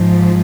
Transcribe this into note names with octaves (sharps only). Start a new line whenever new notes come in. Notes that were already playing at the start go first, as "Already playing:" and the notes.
Already playing: G#2 F3